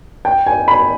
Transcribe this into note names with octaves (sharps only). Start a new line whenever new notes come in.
G5
G#5
B5